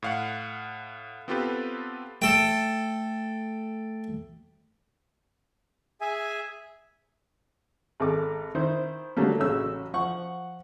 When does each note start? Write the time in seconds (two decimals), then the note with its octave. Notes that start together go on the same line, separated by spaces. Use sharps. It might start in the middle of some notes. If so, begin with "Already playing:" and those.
0.03 A2 F5 F#5
1.28 B3 C4 F4 G4 A4 B4
2.22 A3 A4 G5
6.01 G#4 E5 G#5
8.00 G#1 A4 D6
8.55 D#3 E4 C5
9.17 D3 F#3 G3 A3 A#3
9.39 A1 C#3 F#3 C#4 E6
9.94 F3 F#5 C#6